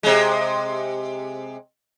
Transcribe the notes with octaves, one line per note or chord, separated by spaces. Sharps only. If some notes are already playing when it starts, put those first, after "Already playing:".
C3 G#3